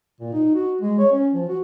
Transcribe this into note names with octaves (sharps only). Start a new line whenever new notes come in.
A#2
D#4
F#4
G#3
C#5
C#4
F3
F#4